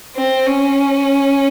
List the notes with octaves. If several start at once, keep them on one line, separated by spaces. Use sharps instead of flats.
C4
C#4